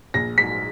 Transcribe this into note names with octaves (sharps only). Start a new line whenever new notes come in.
A#1 A#6
G#2 F#3 B6